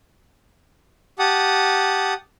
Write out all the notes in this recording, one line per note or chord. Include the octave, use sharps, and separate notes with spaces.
G4 F#5 A5 D#6